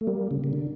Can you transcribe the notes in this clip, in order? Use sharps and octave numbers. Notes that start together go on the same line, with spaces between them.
A3
G3 A#3
C#3
C#3
D3